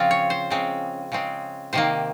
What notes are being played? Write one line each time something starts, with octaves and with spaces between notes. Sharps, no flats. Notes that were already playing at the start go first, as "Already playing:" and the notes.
Already playing: C#3 F3 C4 F4
C#5
C5
C#3 G#3 C4
C#3 G#3 C4
C3 D#3 A#3 C5